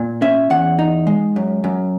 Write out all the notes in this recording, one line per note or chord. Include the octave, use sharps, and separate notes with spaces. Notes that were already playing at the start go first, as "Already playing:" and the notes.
Already playing: A#2
C#4 E5
E2 F#5
D#4
G#3
F#2
F#2